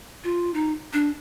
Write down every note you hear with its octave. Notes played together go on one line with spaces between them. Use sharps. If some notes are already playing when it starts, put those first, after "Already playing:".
F4
D#4
D4